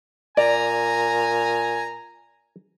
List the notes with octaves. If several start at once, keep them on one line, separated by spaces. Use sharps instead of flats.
A#2 D5 G#5 A#5